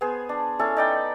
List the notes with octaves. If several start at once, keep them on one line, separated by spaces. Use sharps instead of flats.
B3 G#4 C5
D4
C#4 E4 A4 D5
D#4 D5 G5 B5